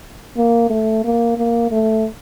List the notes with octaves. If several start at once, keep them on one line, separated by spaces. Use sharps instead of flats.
A#3
A3
A#3
A#3
A3